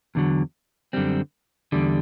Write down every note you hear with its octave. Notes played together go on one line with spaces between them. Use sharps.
E2 D3 F#3
F#2 D3 G3 C4
E2 D3 G3